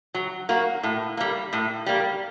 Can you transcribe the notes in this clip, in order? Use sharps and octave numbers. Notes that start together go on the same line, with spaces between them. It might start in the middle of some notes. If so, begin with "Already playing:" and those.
F#3
A#3 F#4
A2
G3 A#3
A2
G3 A#3